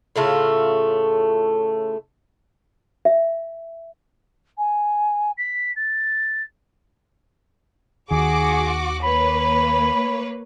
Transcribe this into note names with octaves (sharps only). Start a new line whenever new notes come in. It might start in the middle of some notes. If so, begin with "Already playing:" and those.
A2 C#3 A3 F4
E5
G#5
B6
A6
D#2 D#3 F#4 G#4 D6
A#3 B4 C#5 B5